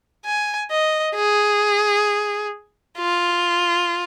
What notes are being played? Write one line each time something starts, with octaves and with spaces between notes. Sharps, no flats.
G#5
D#5
G#4
F4